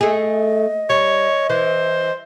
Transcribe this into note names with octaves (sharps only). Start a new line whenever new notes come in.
A3 G#4 D#5
G3 C#5
E3 C5